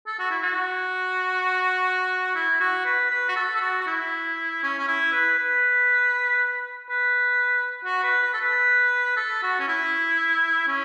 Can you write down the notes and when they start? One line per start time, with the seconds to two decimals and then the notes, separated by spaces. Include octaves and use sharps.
0.07 A4
0.19 F#4
0.31 E4
0.42 F#4
2.35 E4
2.60 F#4
2.85 B4
3.10 B4
3.29 F#4
3.36 A4
3.56 A4
3.61 F#4
3.81 F#4
3.87 E4
4.63 C#4
4.78 C#4
4.87 E4
5.12 B4
5.38 B4
6.90 B4
7.85 F#4
8.03 B4
8.22 B4
8.33 A4
8.41 B4
9.17 A4
9.43 F#4
9.59 C#4
9.68 E4
10.68 C#4